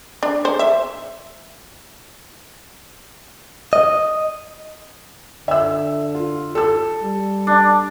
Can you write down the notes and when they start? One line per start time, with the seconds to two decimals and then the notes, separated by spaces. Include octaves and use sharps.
0.23 D4
0.45 C5
0.59 E5
3.73 D#5
5.48 D3 E5 E6
6.15 F4
6.55 A4 E6
7.02 G3
7.47 D4